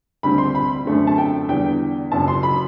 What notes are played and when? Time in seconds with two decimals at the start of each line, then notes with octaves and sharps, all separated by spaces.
0.23 D2 D3 G3 C4 B5
0.38 C6
0.55 B5
0.85 F#2 D3 A3 C4
1.07 A5
1.18 G5
1.49 E2 D3 G3 G5
2.12 F#1 F#2 F#3 A5
2.28 C6
2.43 B5